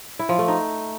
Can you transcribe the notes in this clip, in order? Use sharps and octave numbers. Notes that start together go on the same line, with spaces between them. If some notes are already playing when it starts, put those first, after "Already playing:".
E4
F3
A3
D#4